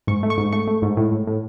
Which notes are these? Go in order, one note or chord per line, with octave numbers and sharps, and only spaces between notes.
G#2 C#6
A3
C#6
G#2
A3 C#6
A3
G#2
A2
A2
A2